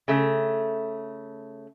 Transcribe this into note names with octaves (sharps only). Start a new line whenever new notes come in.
C#3 A3